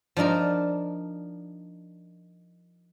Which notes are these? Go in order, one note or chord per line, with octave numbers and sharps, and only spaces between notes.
F3 D4 D#4 A#4 D5